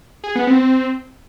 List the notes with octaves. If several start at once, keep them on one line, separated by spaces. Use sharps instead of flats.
G#4
B3
C4